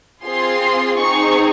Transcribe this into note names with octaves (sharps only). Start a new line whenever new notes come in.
C4 F4 G#4 C6
C4 D#4 G#4 C#6